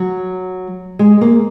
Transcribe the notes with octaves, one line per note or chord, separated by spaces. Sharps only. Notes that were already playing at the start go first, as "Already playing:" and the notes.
Already playing: F#3
G#3
A#3